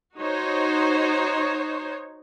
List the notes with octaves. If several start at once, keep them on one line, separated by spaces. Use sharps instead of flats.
D#4 F#4 C5 C#5